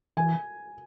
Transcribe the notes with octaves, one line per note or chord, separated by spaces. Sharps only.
E3 G#5